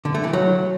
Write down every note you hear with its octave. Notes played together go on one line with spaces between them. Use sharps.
D3
A3
E3
F#3